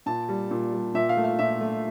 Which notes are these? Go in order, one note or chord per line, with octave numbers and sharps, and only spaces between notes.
A#2 A5
G3
A#2
G3
A#2 E5
F5
A3
F5
A#2 E5
A3